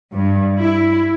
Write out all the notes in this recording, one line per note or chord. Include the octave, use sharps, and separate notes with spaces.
G2
E4